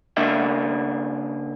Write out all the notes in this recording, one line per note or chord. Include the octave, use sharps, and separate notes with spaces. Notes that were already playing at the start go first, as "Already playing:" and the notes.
C#3 A#3 D4 E5